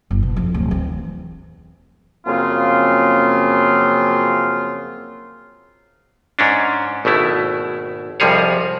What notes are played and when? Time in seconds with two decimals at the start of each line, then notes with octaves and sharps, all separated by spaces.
0.11 F#1
0.23 B2
0.36 F2
0.54 D1
0.71 E3 C4
2.26 F#2 C#3 F3 A#3 C4 F4
6.39 G#2 C#4 D4
7.05 G#1 B2 A3 E4
8.20 C2 F2 F3 G3 G#4 C#5